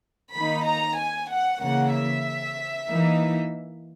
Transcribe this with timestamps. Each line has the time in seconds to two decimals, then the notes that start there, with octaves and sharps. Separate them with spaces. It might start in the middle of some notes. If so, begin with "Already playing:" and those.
0.34 D#3 A#3 D#4 B5
0.67 A#5
0.98 G#5
1.30 F#5
1.61 C#3 E3 A#3 F#5
1.93 E5
2.89 E3 A#3 D#4